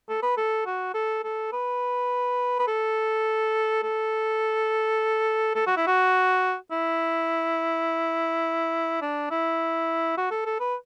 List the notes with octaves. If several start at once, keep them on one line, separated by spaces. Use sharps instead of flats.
A4
B4
A4
F#4
A4
A4
B4
B4
A4
A4
A4
F#4
E4
F#4
E4
D4
E4
F#4
A4
A4
B4